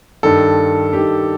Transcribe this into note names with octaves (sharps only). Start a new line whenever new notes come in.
G2 D#3 A4
G2 D#3 G4